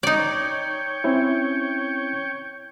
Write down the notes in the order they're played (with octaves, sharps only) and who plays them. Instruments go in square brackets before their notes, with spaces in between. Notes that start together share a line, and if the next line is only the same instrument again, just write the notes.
[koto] D#4 D5 [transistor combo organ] C#5 G5
[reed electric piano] C4 C#4 E4